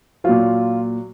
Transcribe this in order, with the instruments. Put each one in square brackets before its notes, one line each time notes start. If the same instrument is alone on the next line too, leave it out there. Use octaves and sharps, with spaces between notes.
[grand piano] A#2 F#3 F4